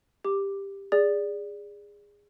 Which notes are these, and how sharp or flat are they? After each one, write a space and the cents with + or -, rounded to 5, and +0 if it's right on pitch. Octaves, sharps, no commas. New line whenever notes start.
G4 +10 D6 +0
G#4 -20 D5 -5